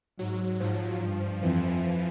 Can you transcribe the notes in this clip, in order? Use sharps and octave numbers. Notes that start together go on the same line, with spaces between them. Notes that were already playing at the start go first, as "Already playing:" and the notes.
G#2 F#3
G#2 F3
G2
F2 E3